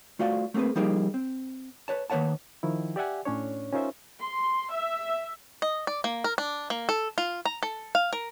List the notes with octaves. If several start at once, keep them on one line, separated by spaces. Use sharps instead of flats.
A3 F4 F#4 C5 D5 F5
A3 A#3 C4 G#4 B4
F3 G3 A#3 D#4 G4 G#4
C4
B4 C#5 A5
D#3 A#3 B4 C#5 F#5 A5
D#3 F3 E4
G4 D5 E5 F#5 G#5
A2 C#4 D4 C#5
C#4 D#4 F4 A#4 C5 E5
C6
E5
D#5
D5
A#3
A#4
D4
A#3
A4
F4
A#5
A4
F5
A#4